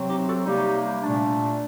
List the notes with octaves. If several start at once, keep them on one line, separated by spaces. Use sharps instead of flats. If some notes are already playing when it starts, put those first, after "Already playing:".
Already playing: C3 F#3 C4
D#4 G4
F#4 A4
C3 G3 A#3 D#4 G4
A#2 A3 D4